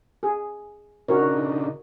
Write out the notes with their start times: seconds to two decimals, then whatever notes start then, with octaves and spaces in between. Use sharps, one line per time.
0.23 G#4
1.08 C#3 D4 D#4 F#4 A#4 C#5